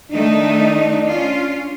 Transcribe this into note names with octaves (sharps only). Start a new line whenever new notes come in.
D#3 A3 D4 D#4
C#4 F4